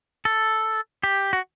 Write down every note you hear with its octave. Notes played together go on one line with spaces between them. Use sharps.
A4
G4
F#4